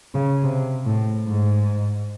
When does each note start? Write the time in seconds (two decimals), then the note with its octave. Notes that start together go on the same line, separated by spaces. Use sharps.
0.15 C#3
0.43 C3
0.86 A2
1.28 G#2